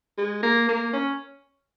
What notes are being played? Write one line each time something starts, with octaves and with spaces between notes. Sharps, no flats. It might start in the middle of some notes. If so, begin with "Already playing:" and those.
G#3
A#3
A#3
C#4